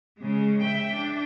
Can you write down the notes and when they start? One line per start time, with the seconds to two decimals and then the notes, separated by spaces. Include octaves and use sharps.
0.18 C#3 G#3
0.62 E5 G5
0.93 D4